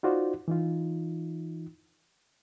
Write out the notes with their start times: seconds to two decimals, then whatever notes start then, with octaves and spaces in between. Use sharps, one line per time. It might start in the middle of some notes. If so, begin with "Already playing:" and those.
0.03 D#4 F4 F#4 C5 D5
0.48 E3 D#4 F4